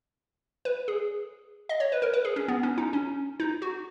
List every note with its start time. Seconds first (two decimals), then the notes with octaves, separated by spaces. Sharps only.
0.65 B4
0.88 G#4
1.69 D#5
1.80 C#5
1.92 B4
2.02 A#4
2.14 B4
2.25 G#4
2.36 C#4
2.48 B3
2.63 C#4
2.78 D#4
2.93 C#4
3.40 D#4
3.62 F#4